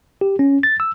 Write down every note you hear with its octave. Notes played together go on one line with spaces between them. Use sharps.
G4
C#4
A6
E6